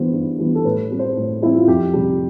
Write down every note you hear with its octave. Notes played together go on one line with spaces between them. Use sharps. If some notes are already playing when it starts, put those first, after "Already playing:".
Already playing: G2 E3 G3 B3 C5
G2
E3 G3 B3
A4
A2 B4
G3 C4
C5
A2
G3 C4 E4
F4
F2 G4
C3 G3